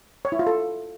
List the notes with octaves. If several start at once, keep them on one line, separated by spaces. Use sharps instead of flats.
C#5
E4
F4
A4